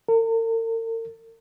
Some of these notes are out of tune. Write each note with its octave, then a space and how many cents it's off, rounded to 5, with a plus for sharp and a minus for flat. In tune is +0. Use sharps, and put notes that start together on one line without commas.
A#4 -45